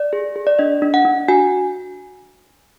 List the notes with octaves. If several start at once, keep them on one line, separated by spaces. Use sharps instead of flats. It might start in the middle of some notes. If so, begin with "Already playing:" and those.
Already playing: D5
G#4
G#4
D5
D4 D#5
D4
F#5
D4
F#4 G#5